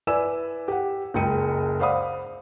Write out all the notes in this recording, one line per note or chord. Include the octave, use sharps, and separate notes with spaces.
E4 B4 D5 G#5 E6 E7
G4 F#5
F#1 C#2 G5 C#7 D#7
C5 D5 F5 F#5 B5 D#6